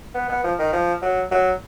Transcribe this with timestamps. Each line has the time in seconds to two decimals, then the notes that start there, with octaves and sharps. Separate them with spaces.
0.15 B3
0.30 B3
0.44 F3
0.59 D#3
0.73 F3
1.02 F#3
1.31 F#3